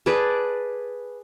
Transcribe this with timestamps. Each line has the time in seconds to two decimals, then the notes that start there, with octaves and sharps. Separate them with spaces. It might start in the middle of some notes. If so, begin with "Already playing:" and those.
0.06 G#4 B4 D5 A5